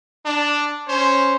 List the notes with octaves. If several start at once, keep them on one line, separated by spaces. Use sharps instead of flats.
D4
C#4 C5